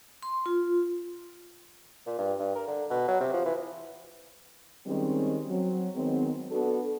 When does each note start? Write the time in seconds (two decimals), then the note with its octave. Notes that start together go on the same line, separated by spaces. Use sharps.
0.23 C6
0.46 F4
2.07 A#2
2.18 G2
2.39 G2
2.56 A#4
2.68 D3
2.90 B2
3.08 F#3
3.20 C3
3.33 F3
3.45 E3
4.87 D#3 G3 G#3 C4 C#4
5.48 F#3 C4
5.94 D#3 F#3 G#3 B3 C4
6.51 B3 D4 F#4 A4